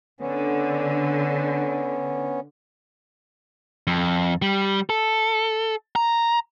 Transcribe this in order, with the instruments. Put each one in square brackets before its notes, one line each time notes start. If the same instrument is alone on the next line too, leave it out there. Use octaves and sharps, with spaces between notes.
[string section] D3 [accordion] B3 C#4
[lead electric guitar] F2
G3
A4
A#5